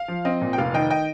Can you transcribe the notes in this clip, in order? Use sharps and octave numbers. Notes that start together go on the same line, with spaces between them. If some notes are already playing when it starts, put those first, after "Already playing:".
Already playing: F5
F3
C4 D#5
A#2
G5
F1 F5
D#3 D#5 G5
D#5 G5